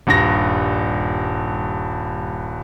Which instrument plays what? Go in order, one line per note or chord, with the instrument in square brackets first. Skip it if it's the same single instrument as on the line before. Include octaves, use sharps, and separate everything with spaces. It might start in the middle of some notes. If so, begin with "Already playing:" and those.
[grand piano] D#1 G2 A#6